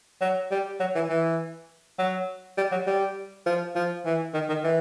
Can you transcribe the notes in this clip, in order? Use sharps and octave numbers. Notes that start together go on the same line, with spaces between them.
F#3
G3
F#3
E3
E3
F#3
G3
F#3
G3
F3
F3
E3
D#3
D#3
E3